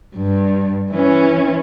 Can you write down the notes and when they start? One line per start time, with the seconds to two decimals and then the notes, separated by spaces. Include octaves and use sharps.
0.16 G2
0.91 E3 C#4